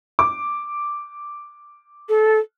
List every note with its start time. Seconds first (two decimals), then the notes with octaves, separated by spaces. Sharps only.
0.19 D6
2.09 A4